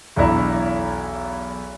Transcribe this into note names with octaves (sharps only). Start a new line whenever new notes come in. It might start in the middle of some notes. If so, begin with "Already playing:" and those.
B1 E2 D4 E4 A#5